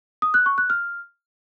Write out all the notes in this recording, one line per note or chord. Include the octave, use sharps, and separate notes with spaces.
D#6
F#6
C#6
F#6
F6